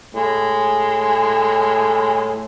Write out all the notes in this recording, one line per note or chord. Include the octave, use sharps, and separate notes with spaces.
A2 G#3